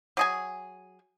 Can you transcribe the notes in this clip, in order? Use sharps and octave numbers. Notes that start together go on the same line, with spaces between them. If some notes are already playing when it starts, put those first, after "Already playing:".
F#3 G#4 G#5